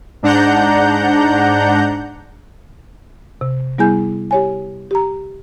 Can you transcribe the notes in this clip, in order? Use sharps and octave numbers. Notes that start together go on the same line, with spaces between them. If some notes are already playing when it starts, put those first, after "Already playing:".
G#2 D4 F#5 A#5 G6
C3
G3 B3 E4 G#4 G#5 G6
G4 C#5 G#5
G4 A#5